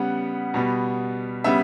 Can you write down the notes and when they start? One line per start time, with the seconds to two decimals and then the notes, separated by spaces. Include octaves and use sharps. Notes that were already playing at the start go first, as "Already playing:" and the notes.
Already playing: C#3 G3 B3 F#5
0.54 B2 G3 B3
1.44 C#3 G3 B3 E5